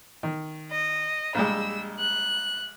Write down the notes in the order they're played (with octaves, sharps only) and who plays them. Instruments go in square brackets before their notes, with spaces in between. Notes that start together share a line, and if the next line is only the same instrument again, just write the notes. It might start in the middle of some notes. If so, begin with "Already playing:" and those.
[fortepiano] D#3
[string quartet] D#5
[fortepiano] A#1 G3 G#3 [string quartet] E6
[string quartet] F#6